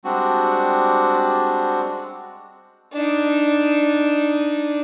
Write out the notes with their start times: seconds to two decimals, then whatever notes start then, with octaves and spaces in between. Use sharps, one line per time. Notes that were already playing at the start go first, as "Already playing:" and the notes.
0.05 G3 G#3 C4 D4 F#4
2.93 D4 D#4